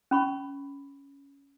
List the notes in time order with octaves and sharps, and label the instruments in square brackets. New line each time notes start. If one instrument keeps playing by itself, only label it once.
[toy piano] C#4 B5 C#6